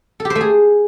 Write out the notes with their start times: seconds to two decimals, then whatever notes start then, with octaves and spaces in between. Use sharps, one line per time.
0.20 A4
0.25 G4
0.30 C5
0.35 A3
0.41 G#4